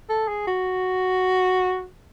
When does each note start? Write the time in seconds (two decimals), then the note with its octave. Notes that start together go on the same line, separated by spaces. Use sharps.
0.09 A4
0.28 G#4
0.47 F#4